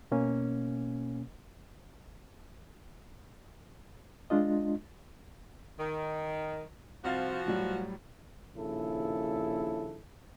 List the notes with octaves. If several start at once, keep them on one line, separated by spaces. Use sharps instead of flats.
B2 A#3 C#4
G#3 D4 F4 D#5
D#3
C2 F3 F#4 F5 A6
A2 F#3 G3
A#1 D#2 C#3 E4 A4